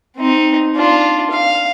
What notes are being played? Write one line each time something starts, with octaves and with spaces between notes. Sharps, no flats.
C4 D#4
D4 F4
F5